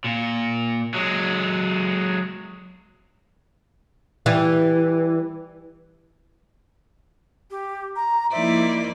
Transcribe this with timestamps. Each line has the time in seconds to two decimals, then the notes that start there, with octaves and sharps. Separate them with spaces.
0.04 A#2
0.94 F#3 G#3
4.26 E3 G3
7.51 G4
7.96 A#5
8.32 F3 A#3 D#4 E4 C5 D5 E5